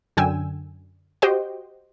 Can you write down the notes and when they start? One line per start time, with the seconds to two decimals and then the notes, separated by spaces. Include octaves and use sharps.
0.17 F#2 D3 G5 G#5 E6
1.22 F#4 G4 C5 D#5 G5